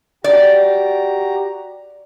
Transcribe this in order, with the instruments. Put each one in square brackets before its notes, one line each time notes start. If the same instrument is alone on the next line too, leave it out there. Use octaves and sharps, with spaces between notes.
[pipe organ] F#4 G4 A#5 [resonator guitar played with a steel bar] D5